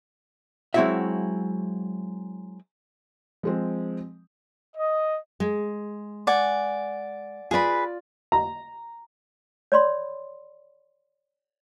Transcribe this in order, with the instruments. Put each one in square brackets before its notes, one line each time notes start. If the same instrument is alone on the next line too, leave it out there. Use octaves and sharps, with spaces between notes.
[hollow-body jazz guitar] F#3 G#3 C4 E4 F#4 E5
[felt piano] F3 G#3 C4
[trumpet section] D#5
[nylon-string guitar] G#3
[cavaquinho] D5 F#5 G#5
[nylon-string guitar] F4 D5 [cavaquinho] G#4 B4 B5
[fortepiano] A#5
[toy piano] C#5 D5 B5 C6